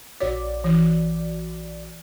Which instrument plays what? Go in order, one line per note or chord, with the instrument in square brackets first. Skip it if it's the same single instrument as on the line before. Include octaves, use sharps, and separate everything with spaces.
[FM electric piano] A#1 F#4 D5 [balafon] C#5
[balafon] E3